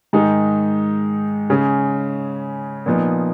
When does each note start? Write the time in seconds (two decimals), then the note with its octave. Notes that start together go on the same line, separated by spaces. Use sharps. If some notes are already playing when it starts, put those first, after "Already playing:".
0.13 G#2 D#3 G#3 D#4
1.50 C#3 G#3 C#4
2.86 A#2 F3 B3 D#4